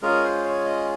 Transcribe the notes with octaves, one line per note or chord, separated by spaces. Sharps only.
G#3 C#4 F4 G#4 A#4
C5
C#5
D#5